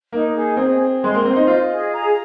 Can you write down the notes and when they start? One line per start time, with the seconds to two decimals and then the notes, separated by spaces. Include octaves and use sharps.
0.12 A#3 D#4
0.34 G#4
0.56 C4 G#4
0.80 G#4
1.02 G#3 C6
1.14 A#3
1.24 C4 C5
1.36 D#4
1.47 F4 D#5
1.70 G#4
1.92 A#5